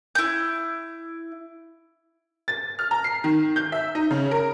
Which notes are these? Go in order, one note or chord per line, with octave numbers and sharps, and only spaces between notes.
E4 G6
A6
F6
A#5
C7
D#3
G6
E5
D#4
C#3
A#4